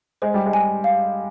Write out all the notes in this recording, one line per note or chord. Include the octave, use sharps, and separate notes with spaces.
G#3 C5
G3
G#3
G#5
F5